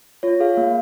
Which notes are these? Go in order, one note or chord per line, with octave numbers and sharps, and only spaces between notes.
F4 C#5
G#4 F5
A#3